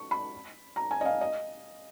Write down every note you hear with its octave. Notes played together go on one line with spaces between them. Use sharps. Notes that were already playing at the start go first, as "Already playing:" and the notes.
Already playing: C#6
B5
A#5
G#5
D#5
F5
D#5